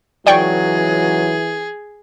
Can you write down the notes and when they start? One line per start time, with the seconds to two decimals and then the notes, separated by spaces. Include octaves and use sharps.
0.27 C#2 E3 F#3 G#4 D5 G5 C#6